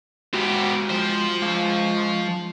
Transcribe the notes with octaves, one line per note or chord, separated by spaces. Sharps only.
G#3 B3 F#4 G4
F3 C5
G#3 F5